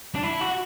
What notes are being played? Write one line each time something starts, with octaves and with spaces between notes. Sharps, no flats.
D4
E4
F#4